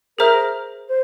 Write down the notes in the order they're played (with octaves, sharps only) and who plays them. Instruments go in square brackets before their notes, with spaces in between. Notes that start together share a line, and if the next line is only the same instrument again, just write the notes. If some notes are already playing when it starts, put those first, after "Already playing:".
[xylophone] G#4 C5 E5 A#5 F6 [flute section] A#4
[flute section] C5